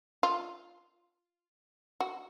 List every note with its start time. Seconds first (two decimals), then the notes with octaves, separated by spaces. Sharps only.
0.23 F4
2.00 F#4